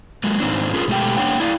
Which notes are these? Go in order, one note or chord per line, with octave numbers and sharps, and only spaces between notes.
F#3 G#3 A#3
G#2 D#3 C4 D4
C#4 F4 G#4 A#4
B2 G#3 A3 G4 G5
A#3 D4 C#5 F#5 G5
E4 D5 D#5 F5